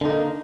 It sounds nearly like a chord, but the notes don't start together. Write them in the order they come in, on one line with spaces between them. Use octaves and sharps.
D3 D#4 A#3